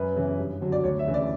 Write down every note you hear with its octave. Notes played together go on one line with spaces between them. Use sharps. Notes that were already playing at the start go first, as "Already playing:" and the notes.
Already playing: F#2 B4
C#3 E3
G2
D3 F#3
D5
D2 C#5
E5
C#3 E3
D5